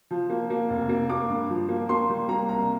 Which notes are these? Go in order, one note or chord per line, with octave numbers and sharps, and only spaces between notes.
F3
A#3
A#3
F1
A#3
A#3 D6
G2
F3
A#3
A#3 C6
G3
A#3 A#5
C2 A#5